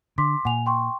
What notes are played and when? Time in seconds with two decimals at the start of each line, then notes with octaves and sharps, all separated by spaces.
0.18 D3 C6 D6 B6
0.45 A#2 F#5 G#5 F7
0.66 G5 C6 C#6